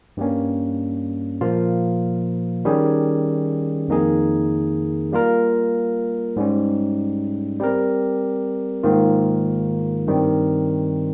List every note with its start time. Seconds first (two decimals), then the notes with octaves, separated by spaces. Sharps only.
0.17 G2 G3 A#3 C#4
1.41 A#2 F3 A#3 F4
2.65 D#3 G3 C#4 G#4
3.88 F2 D#3 A#3 D#4 G#4
5.12 G3 A#3 F4 A#4
6.36 G#2 G3 C#4
7.60 G3 C4 G4 A#4
8.83 G#2 D#3 A#3 F4
10.07 G2 D#3 G3 C4